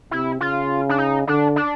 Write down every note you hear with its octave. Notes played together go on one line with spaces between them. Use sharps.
C3 E4
C#3 F4
D4
D#4
D3 D4
D4